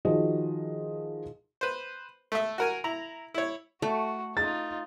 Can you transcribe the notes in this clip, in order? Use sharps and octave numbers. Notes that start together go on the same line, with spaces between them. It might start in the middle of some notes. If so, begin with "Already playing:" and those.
D#3 F3 F#4 G#4 D#5
B4 C5
A3 E5
F#4 A#4 G#5
E4 A#5
E4 C#5
A3 F#4
D#4 F4 A6